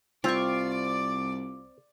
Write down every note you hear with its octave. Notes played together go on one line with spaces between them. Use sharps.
C2 C4 F4 D5 C#6 D6